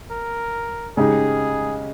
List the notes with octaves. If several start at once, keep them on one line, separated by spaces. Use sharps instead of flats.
A#4
C#3 G#3 D#4 G4 G#4